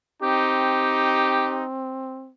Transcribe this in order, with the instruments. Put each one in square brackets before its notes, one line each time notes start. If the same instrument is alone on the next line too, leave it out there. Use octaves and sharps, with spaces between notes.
[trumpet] C4 [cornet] D#4 [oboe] G4